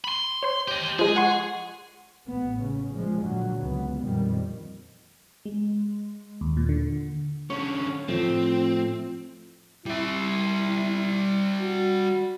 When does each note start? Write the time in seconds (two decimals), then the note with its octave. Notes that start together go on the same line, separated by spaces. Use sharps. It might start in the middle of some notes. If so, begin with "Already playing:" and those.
0.04 B5 C6
0.43 C5 C#5
0.68 G4 D#5
0.99 F3 G#3 G#4
1.16 F#5 C6 C#6
2.27 A1 B3
2.62 C#3
2.92 A#2 F3 G#3
3.21 A#2 D3 F#3
3.56 C#2 B3
4.02 F2 A#2 D#3 G3
5.45 G#3
6.41 D#2
6.57 A#2
6.69 D3
7.50 D3 C#4 C#5
8.08 A2 F3 A3 C4
9.86 G3 E4 E5
11.61 F#4